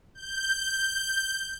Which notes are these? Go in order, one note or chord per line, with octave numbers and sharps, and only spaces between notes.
G6